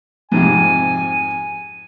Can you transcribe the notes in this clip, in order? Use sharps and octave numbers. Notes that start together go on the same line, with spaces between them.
F2 G#2 C3 G#5